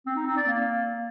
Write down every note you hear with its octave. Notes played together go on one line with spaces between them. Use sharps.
C4
D#4
C4
D5
A#3